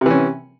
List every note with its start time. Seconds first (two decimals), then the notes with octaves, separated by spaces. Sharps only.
0.01 C3
0.06 E3
0.10 C#4